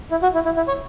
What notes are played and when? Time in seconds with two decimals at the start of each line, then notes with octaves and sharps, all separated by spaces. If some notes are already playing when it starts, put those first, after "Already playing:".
0.11 E4
0.23 F#4
0.34 E4
0.45 E4
0.57 E4
0.68 C#5